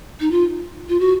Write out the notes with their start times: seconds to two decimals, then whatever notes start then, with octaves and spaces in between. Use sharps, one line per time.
0.20 D#4
0.31 F4
0.89 F4
1.00 F#4